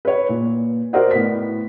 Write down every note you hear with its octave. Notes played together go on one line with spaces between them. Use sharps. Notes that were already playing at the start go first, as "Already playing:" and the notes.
B4 C#5
A#2
F#4 A#4 C5 D5 D#5 F#5
A2 B3 B6